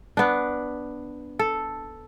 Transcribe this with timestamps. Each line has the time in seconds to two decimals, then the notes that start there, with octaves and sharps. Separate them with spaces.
0.17 B3 D4
1.39 A4